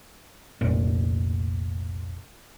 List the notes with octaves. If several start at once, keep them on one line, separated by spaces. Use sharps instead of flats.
F1 C2 A#2